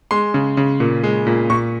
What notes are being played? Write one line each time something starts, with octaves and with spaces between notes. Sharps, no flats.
G#3 C6
C#3
C#3
A#2
G#3
A#2
A#2 C#6